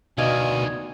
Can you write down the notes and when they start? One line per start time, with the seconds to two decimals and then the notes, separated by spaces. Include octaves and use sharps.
0.18 D2 B2 D#3 D5 D#5 F5 G#5